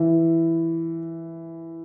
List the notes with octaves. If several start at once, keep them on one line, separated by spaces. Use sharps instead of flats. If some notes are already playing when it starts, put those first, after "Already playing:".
Already playing: E3